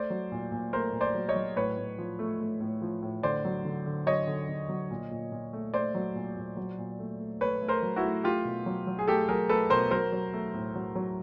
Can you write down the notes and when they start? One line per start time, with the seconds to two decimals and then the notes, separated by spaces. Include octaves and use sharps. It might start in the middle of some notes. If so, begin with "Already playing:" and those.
Already playing: A3 C5 D5
0.10 F#3
0.32 A#2
0.52 A#2
0.73 A3 A#4 C5
0.93 A#2
1.01 C5 D5
1.14 F#3
1.29 C#5 D#5
1.35 F#3
1.57 A2 B4 C#5
1.78 A2
1.98 F3
2.19 A3
2.40 A3
2.61 A2
2.82 F3
3.02 A2
3.23 D3 C5 D5
3.45 F#3
3.65 D3
3.86 D3
4.06 F#3 C#5 D#5
4.27 D3
4.49 D3
4.69 F#3
4.91 A#2
5.11 A#2
5.32 A#2
5.53 A3
5.74 A3 C5 D5
5.95 F#3
6.15 A#2
6.36 A#2
6.57 F#3
6.79 A#2
6.99 A3
7.20 A3
7.41 A3 B4 C#5
7.62 A3
7.68 A#4 C5
7.82 F#3
7.96 E4 F#4
8.04 A3
8.24 A3 F4 G4
8.45 B2
8.66 F#3
8.87 F#3
8.99 G#4
9.07 A3 G4 A4
9.28 F#3 G#4 A#4
9.49 A3 A4 B4
9.70 B2 A#4 C5
9.91 F#3 A#4 C5
10.12 F#3
10.33 A3
10.54 A2
10.75 F#3
10.96 F#3